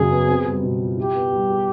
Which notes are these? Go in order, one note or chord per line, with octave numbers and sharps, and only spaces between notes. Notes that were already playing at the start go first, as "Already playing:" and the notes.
Already playing: F#2 C#3 F#3 G#4
B3
C4
G3
B2
F4
E4 G4
B3
G3
G#4